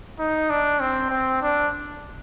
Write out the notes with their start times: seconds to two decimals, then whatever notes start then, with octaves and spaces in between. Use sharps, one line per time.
0.19 D#4
0.50 D4
0.80 C4
1.10 C4
1.42 D4